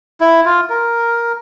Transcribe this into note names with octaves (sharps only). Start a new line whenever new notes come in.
E4
F4
A#4